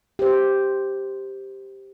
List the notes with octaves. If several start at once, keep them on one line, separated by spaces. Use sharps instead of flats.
G4 C5